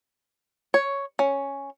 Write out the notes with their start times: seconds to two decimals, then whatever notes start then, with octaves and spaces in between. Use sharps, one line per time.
0.74 C#5
1.19 C#4